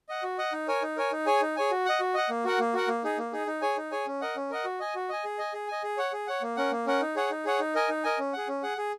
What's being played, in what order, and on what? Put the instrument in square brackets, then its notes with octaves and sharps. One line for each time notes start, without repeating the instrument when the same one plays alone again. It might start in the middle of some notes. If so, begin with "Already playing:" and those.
[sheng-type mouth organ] D#5 F#5
F#4
D#5 F#5
D#4
A#4 C#5 G#5
D#4
A#4 C#5 G#5
D#4
G#4 C#5 G#5
D#4
G#4 C#5 G#5
F#4
D#5 F#5
F#4
D#5 F#5
A#3
F#4 A#4 F#5
A#3
F#4 A#4 F#5
A#3
D#4 G#4
A#3
D#4 G#4
D#4
G#4 C#5 G#5
D#4
G#4 C#5 G#5
C#4
A#4 D#5 F#5
C#4
A#4 D#5 F#5
F#4
D#5 G#5
F#4
D#5 G#5
G#4
D#5 G#5
G#4
D#5 G#5
G#4
C#5 F#5
G#4
C#5 F#5
A#3
C#4 A#4 F#5
A#3
C#4 A#4 F#5
D#4
G#4 C#5 F#5
D#4
G#4 C#5 F#5
D#4
A#4 D#5 G#5
D#4
A#4 D#5 G#5
C#4
G#4 F#5
C#4
G#4 F#5
G#4